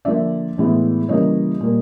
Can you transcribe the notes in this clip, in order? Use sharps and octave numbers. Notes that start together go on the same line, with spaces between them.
D3 F3 A#3 D5 E5
A2 E3 G#3 B3
C#3 E3 G3 A#3 C#5 D#5
A#2 G3 A#3